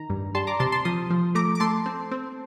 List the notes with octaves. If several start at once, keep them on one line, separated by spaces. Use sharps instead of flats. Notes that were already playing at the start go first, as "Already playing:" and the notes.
Already playing: D#3 A#5
G2
G3 A5 C6
A#5 D6
C3 A5 C6
A5 C6
F3 C6 D#6
F3
A3 A#5 D6
D6
A3 A5 C6
C4
C4